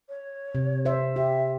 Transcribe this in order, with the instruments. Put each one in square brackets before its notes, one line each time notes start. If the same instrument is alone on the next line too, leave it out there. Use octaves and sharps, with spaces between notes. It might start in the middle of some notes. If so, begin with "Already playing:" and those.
[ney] C#5
[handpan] C3
C5 E5
[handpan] G4 [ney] E5